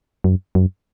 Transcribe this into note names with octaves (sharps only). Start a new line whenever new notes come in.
F#2
F#2